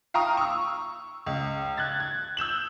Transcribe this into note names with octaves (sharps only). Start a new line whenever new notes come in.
F5 G5 A#5 C#6 D#6 F6
C#6 E6
C#2
F#6 G#6 A6
G#6
E6 G6 E7 F#7